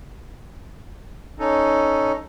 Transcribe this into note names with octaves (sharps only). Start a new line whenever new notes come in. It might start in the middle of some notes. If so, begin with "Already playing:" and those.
C#4 D#4 A4